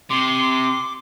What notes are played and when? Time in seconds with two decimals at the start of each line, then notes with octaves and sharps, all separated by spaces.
0.10 C3 C6 D6